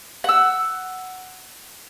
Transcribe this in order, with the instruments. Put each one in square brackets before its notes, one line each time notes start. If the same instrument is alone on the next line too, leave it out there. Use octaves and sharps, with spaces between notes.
[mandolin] F#5 E6